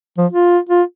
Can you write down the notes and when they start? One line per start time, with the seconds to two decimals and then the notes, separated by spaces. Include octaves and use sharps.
0.17 F3
0.31 F4
0.69 F4